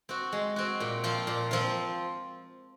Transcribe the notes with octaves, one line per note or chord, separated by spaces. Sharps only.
C4 F#4
G#3
C4 F#4
A#2
F3 C4 F4
A#2
F3 C4 F4